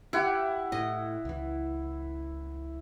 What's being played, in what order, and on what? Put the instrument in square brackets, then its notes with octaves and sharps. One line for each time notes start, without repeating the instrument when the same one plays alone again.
[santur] E4 F#5 [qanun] G4
[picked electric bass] A2 [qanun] D#5
[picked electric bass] C#2 E3